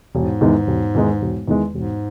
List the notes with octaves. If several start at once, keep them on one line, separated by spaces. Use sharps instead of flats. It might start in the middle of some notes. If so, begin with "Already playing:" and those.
E1 G#2
E2 D#3 G#3
E1
E2 D#3 G#3
E1
E2 D#3 G#3
E1 G#2